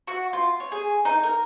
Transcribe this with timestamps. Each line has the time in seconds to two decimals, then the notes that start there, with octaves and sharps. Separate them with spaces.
0.08 F#4
0.33 F4
0.60 C#5
0.72 G#4
1.05 D#4
1.24 A#4